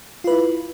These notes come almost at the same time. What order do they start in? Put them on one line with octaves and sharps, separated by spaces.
F4 B4 E4